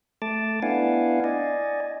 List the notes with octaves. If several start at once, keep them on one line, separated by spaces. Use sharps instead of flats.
A3 A5 D6
B3 D4 E4 F5 F#5 G#5
D5 D#5 G#5